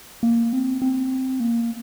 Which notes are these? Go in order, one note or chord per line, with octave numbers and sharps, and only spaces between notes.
A#3
C4
C4
A#3